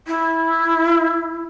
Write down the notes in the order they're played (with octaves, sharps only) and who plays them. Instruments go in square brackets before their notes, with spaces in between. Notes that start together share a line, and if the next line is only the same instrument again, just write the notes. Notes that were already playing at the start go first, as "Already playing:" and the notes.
[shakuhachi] E4